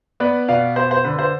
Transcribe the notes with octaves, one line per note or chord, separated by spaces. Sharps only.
B3 B4 D5
B2 D5 F5
B3 C5
C5
D3 B4
C5